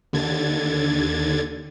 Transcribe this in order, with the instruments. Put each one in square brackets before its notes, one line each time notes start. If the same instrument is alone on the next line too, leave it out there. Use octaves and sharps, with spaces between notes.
[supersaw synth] D#2 D3 G#6 A6